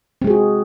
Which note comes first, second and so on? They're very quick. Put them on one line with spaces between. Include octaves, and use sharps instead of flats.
C4 G#3 G#4 F#4